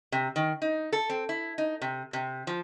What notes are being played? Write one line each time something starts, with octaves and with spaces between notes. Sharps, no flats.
C3
D#3
D#4
A4
C4
E4
D#4
C3
C3
F3